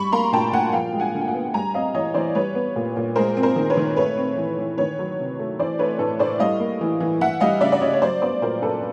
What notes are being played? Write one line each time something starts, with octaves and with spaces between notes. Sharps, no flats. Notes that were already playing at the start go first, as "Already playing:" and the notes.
Already playing: G3 B5 C#6
A#3 A#5 C6
A#2 G5 A5
A#2 F#5 G#5
F3 F5 G5
G#3
F#5 G#5
D3
G5
F#5 G#5
B3
G3 G#5 A#5
C4 D#5 F5
E3 C#5 D#5
E3 C5 D5
G3 B4 C#5
B3
A#2
A#2
G#3 A#4 C5
C4
A#4 C5
D#3
B4 C#5
D#3
A3 B4 C#5
C4
E3
E3
D#3 B4 C#5
F#3
C3
A3
E3 C5 D5
A3 B4 C#5
A2 A4 B4
A2 C5 D5
G3 D#5 F5
A#3
E3
E3
E3 E5 F#5
G3 D#5 F5
C#3 D5 E5
D5
C#3 C#5 D#5
C#5
F#3 C5 D5
B3 C5 D5
A#2 A#4 C5
A#2 A4 B4